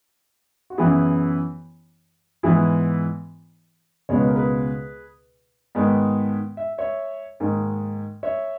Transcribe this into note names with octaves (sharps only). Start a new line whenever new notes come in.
F#4
F#2 E3 B3 E4 G#4
G#2 E3 B3 E4 G#4
C#2 B2 G#3 B3 C#5
B4
A#4
G#4 B4
G#2 D#3 G#3 B3
E5
C#5 E5
G#2 D#3 A#3
C#5 E5